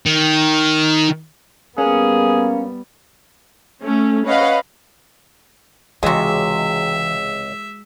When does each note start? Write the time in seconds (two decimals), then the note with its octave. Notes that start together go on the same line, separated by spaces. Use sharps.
0.06 D#3
1.78 G3 A#3 B3 C#4 G#4
3.83 A3 C#4
4.25 C#4 B4 C#5 D#5 F5 F#5
6.03 C#2 C3 E3 G#3 F#4 E5